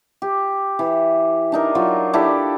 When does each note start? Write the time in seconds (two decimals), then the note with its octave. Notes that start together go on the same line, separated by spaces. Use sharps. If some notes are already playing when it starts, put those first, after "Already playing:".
0.22 G4
0.79 E3
1.52 D4 D#4 A#4
1.75 F#3 F4
2.13 D4 E4 G4 A4